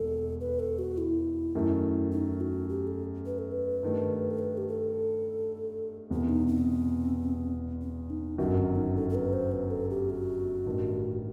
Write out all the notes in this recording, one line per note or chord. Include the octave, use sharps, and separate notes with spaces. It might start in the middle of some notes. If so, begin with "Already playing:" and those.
Already playing: E1 D#2 D#3 A4
B4
A4
F#4
E4
F#2 D#3 A3
D#4
F#4
G4
A4
B4
A4
B4
G2 D#3 A3
A4
B4
G4
A4
E1 E2 C3 B3
C4
D#4
C4
C4
D#4
G1 F#2 D#3 F#3 F#4
C4
D#4
A4
A4
B4
C5
B4
A4
G4
F#4
A1 G2 D#3